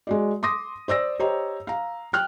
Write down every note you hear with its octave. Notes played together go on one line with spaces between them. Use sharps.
G#3 F#4 D5
C6 D6 D#6 A#6
C5 D5 E6 A#6
G4 C5 C#5 D#5 A#5
F5 A#5
G5 F6 F#6